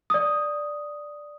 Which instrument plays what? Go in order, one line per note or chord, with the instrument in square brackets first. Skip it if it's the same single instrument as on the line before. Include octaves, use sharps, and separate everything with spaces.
[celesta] D5 D#6